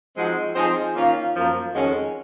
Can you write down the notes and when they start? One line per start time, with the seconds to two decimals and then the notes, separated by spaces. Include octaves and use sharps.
0.16 F3 G#3 C4 D#4 F#4
0.55 F3 C4 D#4 G#4 C5
0.95 D#3 A#3 C#4 F4
1.34 F#2 F3 A#3
1.73 F2 D#3 G#3 C#4 F#4